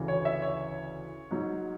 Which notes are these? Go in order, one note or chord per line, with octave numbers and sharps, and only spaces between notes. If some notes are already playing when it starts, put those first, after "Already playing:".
Already playing: D2 C#3 E3
C#5
E5
C#5
G#2 F#3